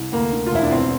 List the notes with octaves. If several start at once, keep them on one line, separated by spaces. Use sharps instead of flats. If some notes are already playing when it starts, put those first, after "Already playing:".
Already playing: C2
D2 A#3
D3
F4
E1 E4
D4
E2 C4